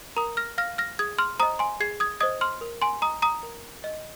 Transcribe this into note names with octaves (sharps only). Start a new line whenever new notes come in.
A#4 A#5 D#6
F6 A#6
F5 F6 A#6
F6 A#6
G#4 D#6 G#6
C6 F6
C5 D#5 A#5 D#6
G#5 C6
G#4 G#6 C7
D#6 G#6
C5 D#5 D#6 G#6
C6 F6
A#4
G#5 C6
D#5 A#5 D#6
A#5 D#6
A#4
D#5